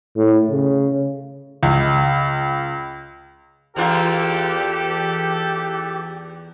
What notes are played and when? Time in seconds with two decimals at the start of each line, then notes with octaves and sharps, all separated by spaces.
0.17 A2
0.50 C#3
1.63 C#2
3.76 E2 F4 G4 A4